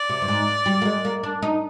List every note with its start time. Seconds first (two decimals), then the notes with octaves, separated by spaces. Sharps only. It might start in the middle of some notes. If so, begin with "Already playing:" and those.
Already playing: D5
0.09 C3
0.22 G2
0.28 G#2
0.66 G3
0.82 A#3
0.85 G#3
1.05 A#3
1.23 D4
1.42 D#4